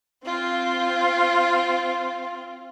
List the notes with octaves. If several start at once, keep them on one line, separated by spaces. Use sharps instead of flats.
C4 F4